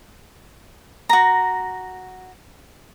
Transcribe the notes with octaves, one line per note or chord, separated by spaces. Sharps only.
F#4 A#5